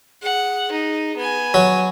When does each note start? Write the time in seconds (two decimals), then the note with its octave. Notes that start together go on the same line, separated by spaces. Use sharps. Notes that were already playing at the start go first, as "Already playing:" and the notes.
0.23 G#4 F#5
0.72 D#4
1.17 B3 G#5
1.54 F#3